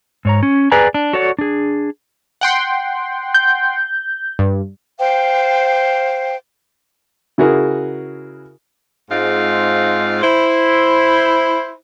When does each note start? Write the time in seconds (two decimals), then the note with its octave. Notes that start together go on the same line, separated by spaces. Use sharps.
0.25 G#2 C#5 A#5
0.43 C#4
0.72 G#4 B4 D5 G5 G#5 A#5
0.94 D4
1.13 F#4 A4 C#5 D5 F#5
1.39 D4 G#4
2.41 F#5 G5 C6
3.34 G6
4.39 G2
4.99 C5 F5 G5
7.38 C#3 E4 F#4 G#4 A#4
9.10 G#2 G#3 C4 D#4 F4 F5
10.22 E4 C5